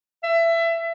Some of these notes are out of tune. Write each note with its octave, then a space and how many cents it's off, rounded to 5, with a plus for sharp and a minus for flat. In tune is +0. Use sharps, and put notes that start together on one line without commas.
E5 +25